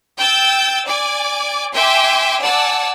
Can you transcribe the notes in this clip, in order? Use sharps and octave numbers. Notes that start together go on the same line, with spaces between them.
G5 E6 G6 A6
D5 G#5 D6
E5 G5 G#5 C6 D6
D5 F#5 G#5 A5 E6